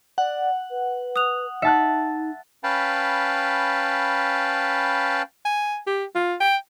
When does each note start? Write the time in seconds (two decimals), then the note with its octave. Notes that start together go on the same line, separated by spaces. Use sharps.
0.18 D5 F#5
0.70 B4
1.16 D#6 F#6 F7
1.62 D#4 E5 F#5 A5 F#6
2.64 C#4 B4 F5 G5 A5 B5
5.45 G#5
5.87 G4
6.15 F4
6.40 G5